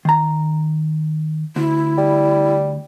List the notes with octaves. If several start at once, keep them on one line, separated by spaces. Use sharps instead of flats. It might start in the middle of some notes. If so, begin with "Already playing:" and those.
D#3 A#5
D2 E4
G3